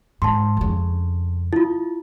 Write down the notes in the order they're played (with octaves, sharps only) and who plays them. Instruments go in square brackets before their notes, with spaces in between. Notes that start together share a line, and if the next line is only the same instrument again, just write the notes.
[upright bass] G#2 [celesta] A5 C6
[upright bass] F2 C#3
[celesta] E4 F4